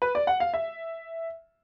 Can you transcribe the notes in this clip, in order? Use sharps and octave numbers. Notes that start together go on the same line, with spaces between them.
B4
D5
F#5
F5
E5